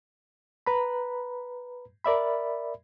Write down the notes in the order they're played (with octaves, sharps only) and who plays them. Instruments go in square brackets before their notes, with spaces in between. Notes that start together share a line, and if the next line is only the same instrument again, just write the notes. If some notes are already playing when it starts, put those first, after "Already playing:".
[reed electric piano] B4 A#5 B5
A#4 D5 E5 B5